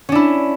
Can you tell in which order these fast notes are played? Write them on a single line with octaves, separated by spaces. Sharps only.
C#4 D4 E4